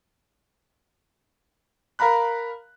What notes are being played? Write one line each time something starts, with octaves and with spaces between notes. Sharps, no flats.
A#4 F5 A#5 B5 F#6